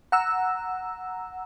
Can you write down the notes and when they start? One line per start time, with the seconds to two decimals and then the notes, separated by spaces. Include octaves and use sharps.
0.12 F#5 A#5 E6